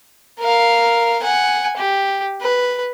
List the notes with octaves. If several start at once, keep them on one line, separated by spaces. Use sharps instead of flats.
A#4 F5
F#5 G#5
G4
B4